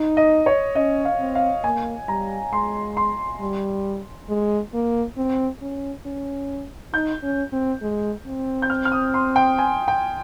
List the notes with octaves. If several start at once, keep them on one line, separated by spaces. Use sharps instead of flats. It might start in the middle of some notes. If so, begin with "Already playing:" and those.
Already playing: D#4
D#5
C#5
C#4 D#5
F5
C4
F5
A#3 G#5
G3 A#5
G#3 C6
C6
G3
G#3
A#3
C4
C#4
C#4
D#4 G6
C#4
C4
G#3
C4
G6
F6
F6
D#6
C6
G5
G#5
G5